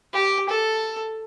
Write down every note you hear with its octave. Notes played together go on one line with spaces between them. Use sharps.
G4
A4